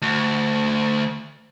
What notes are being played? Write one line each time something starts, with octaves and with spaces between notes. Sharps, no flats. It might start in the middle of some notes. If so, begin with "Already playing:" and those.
D2